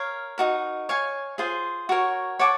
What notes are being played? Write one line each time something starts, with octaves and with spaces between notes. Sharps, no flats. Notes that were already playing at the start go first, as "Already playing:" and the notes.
Already playing: A#4 C#5 F5
D#4 F#4 A#4
C#5 F5 G#5
F4 G#4 C5
F#4 A#4 C#5
C#5 F#5 A5 D6